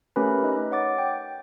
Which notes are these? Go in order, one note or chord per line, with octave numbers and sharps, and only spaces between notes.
A3 C#4 G4 A#4 B4 B5
D#4 D#5 F#6
C#5 F#5 D6 A6
G5